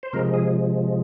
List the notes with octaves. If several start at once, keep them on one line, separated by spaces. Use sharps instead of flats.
C5
C3 F3 G#3 A#4
G#4